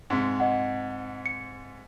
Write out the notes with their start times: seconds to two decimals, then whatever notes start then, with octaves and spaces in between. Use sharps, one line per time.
0.10 G#2 C3
0.40 D#5 F#5
1.26 C#7